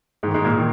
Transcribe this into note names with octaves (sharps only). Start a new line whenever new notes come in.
G#2 G#3
D#3
G#2 G#3
A#2 A#3
D#3